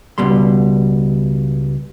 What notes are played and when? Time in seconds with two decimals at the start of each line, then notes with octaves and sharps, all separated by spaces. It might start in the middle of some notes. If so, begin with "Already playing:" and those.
0.18 C#2 B2 G3 C6